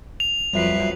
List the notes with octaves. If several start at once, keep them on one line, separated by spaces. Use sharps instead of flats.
F7
F2 F#3 G3 B4 E5 C7